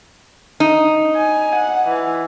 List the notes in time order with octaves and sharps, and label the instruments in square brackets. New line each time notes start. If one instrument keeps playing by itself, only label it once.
[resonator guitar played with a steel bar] D#4
[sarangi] G#5
F#5
E3